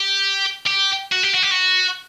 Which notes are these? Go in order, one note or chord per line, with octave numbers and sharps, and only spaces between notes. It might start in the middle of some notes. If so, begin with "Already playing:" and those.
Already playing: G4
G4
F#4
G4
F#4
G4
F#4